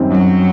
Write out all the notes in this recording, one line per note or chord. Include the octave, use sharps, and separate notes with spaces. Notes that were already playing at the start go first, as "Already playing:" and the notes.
Already playing: F#2 D#3 G3 C4
F#2 F#3